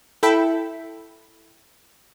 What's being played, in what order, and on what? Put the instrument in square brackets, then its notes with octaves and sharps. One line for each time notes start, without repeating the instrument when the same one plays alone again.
[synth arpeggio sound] E4 A4 E5 G5 B5